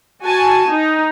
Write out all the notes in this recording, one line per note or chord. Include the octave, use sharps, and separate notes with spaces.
F#4 G#5 A5
D#4